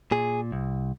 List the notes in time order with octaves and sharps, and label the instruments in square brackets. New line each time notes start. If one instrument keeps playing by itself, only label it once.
[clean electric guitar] A#2 G#4
C2